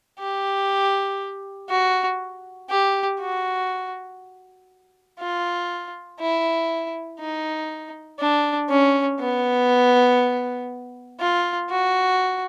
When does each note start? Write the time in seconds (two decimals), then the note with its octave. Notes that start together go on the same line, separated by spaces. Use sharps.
0.20 G4
1.70 F#4
2.70 G4
3.20 F#4
5.20 F4
6.20 E4
7.20 D#4
8.20 D4
8.69 C#4
9.20 B3
11.20 F4
11.70 F#4